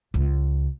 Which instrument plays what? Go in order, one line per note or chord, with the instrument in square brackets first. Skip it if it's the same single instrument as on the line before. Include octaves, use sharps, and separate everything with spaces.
[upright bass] C#2